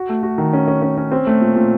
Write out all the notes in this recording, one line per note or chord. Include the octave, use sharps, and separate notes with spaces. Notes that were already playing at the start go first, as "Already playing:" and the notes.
Already playing: F#4
A3
F#4
D#3
C#4
C#4
C#4
C#4
C4
A3
A#2
A#2